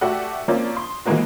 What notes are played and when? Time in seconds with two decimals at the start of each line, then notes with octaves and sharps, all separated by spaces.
0.01 A3 F#4 G4 A4 D5 F#5
0.48 F3 A#3 C4 C#4 F4 D5
0.76 C6 D#6
1.06 E3 F3 G#3 A#3 B3 F#4